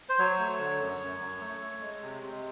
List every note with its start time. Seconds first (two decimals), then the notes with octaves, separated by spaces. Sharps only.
0.09 C5
0.19 F#3 C#5
0.39 A3
0.59 D3
0.80 F#2
1.01 F#2
1.20 F#2
1.41 A3
1.61 A3
1.81 G#3
2.02 C3
2.23 C3